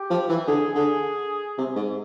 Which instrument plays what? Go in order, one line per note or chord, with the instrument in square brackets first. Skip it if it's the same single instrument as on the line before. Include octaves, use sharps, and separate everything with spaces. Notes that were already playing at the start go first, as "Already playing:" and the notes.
Already playing: [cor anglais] G4
[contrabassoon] F3
E3
[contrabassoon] D3 [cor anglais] G#4
[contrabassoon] D3 [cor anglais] G#4
[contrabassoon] C3
G#2